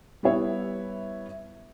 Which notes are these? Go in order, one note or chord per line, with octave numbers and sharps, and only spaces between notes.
G3 B3 E4 C#5 E5